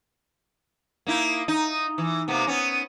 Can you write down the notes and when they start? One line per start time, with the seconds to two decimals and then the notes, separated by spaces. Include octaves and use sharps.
1.06 A#3 D#4 E4
1.48 D#4
1.98 E3
2.28 C3 A#3 B3
2.47 B3 C#4